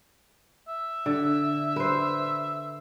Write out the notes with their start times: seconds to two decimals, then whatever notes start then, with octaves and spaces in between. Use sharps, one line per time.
0.68 E5
1.06 D3
1.76 B4 C5